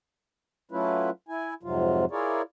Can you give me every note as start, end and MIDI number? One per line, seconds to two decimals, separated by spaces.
0.71 1.10 54
0.71 1.10 57
0.71 1.10 61
0.71 1.10 64
0.71 1.10 65
0.71 1.10 71
1.28 1.54 64
1.28 1.54 80
1.63 2.05 41
1.63 2.05 44
1.63 2.05 48
1.63 2.05 54
1.63 2.05 65
2.11 2.42 64
2.11 2.42 65
2.11 2.42 68
2.11 2.42 70
2.11 2.42 73
2.11 2.42 74